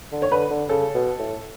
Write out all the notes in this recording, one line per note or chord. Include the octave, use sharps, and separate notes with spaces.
D3
C#5
D3 B4
D3
C#3 A4
B2
A2